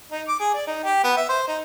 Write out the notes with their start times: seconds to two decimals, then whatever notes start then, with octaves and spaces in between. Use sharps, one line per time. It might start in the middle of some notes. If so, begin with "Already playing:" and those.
0.12 D#4
0.28 D6
0.40 G#4
0.54 D5
0.67 D#4
0.84 G4
1.04 B3
1.17 E5
1.29 C5
1.48 D#4